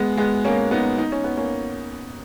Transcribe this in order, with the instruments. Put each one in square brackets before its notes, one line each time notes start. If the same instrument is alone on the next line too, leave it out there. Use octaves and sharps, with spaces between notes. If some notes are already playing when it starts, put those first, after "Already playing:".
Already playing: [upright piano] G#3 B3
G#3 B3
A#3 C#4
B3 D#4
D#4
C#4
B3
A#3 C#4